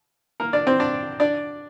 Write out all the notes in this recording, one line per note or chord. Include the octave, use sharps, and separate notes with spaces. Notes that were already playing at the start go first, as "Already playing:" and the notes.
A#3 A#4
D4 D5
C4 C5
D4 D5
D4 D5